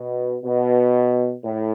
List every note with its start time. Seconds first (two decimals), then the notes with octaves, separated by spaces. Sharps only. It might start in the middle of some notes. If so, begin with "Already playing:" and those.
Already playing: B2
0.43 B2
1.44 A2